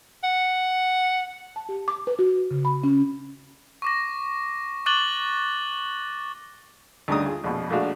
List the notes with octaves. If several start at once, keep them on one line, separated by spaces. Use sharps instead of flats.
F#5
A5
G4
D6
B4
F#4
C#3
B5
C#4
C#6 D6 A#6
C#6 D6 F#6 A6 F#7 G7
D2 G2 C#3 D#4 A#5 D#6
F4 G#4
A#1 F2 B2
A#1 G#3 A3 D4 F#4 F5